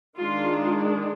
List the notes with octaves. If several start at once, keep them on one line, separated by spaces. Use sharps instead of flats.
D#3 G#3 D4 F4